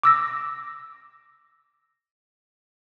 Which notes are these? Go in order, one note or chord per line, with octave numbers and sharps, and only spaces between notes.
D6 E6 A#6